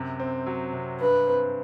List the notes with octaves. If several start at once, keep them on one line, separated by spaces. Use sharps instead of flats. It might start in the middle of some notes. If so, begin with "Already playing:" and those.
Already playing: F#2 C3
C4
F#3
C3
G2 B4
C4